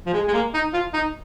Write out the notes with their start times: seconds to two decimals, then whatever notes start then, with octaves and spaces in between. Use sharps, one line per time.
0.06 F3
0.13 G#3
0.28 G#3
0.33 A#3
0.54 D#4
0.73 F4
0.93 D#4